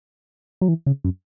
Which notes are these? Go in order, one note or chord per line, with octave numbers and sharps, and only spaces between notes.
F#3
E3
C#3
F#2